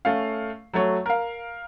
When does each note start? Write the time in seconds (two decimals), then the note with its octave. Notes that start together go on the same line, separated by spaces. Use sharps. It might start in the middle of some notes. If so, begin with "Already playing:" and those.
0.05 A3 C#4 F5
0.74 F#3 A3 C#5
1.06 A#4 F5